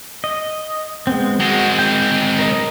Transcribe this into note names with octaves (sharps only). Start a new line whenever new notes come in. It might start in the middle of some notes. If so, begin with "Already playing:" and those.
D#5
G#3 B3 C4
G#3 C4 F#4
G5
A#4 D#5